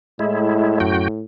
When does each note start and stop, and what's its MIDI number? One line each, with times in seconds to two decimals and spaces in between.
0.19 1.23 45
0.19 0.79 56
0.19 0.79 64
0.80 1.08 42
0.80 1.08 66
0.80 1.08 79